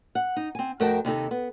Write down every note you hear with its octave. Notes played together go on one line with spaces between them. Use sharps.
F#5
D#4
C4 G#5
F2 A3 F#4 A#4 G5 A5
D#2 C3 D#4 A4
B3